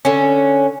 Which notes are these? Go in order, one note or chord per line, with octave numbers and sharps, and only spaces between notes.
D3 C#4